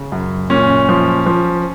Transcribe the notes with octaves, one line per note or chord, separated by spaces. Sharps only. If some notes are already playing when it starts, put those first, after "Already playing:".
Already playing: C#3
F#2
A#2 C#4
F3
F3